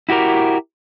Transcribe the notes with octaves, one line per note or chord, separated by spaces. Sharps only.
E4 F#4 G4 A#4